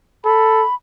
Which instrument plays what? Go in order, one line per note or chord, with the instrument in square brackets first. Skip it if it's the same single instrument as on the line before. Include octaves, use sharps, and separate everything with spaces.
[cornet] A4 [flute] B5